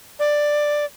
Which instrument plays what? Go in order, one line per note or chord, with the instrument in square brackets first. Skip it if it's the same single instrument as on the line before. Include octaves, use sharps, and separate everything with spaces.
[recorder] D5